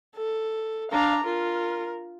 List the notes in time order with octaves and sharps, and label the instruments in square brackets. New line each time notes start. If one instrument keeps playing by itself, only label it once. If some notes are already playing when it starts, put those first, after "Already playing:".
[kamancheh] A4
[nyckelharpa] D4 [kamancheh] F5 A#5
[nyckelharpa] F4 [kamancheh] A#4